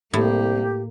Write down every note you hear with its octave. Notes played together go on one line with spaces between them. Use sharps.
C2 A2 A#3 G4